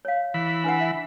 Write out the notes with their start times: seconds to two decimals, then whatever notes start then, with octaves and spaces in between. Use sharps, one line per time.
0.05 C#5 F5
0.34 E3 B5
0.64 D4 B4 F#5
0.80 E5